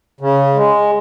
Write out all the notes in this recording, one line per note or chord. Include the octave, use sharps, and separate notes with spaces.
C#3
G#3